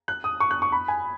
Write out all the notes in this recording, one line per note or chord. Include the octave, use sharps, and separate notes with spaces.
F#6
D#6
C#6
F#6
C#6
B5
G#5